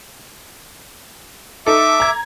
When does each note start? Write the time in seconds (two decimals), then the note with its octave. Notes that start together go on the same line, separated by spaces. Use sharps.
1.66 D#4 A4 E5 D6
2.00 A#5 G#6